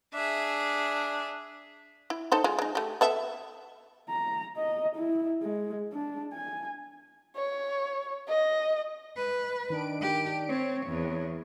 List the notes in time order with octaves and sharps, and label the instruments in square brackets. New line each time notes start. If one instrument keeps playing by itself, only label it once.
[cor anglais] D4 [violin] G#4 E5
[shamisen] E4
D#4 A4 C5
G#3 F4
G#3 D#4
A3 G4
B3 A4 E5
[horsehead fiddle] A#5
D#5
E4
G#3
D4
G#5
[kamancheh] C#5
D#5
[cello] B4
[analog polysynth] D#3 D4 D7
[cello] G4
[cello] C4 [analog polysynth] C#5
[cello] E2